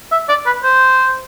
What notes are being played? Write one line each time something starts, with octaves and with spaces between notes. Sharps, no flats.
E5
D5
B4
C5